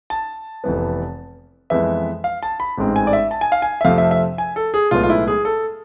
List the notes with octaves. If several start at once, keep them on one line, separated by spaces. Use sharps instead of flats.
A5
F1 F2 E3 B3
F2 E3 G#3 B3 E5
F5
A5
B5
A1 G#2 G#3 C4
G#5
D5
E5
A5
G#5
F5
G#5
E5
F2 C3 F3 A3 C4 F5
E5
E5
G#5
A4
G#4
B1 A2 G#3 B3 F4
F4
E4
G#4
A4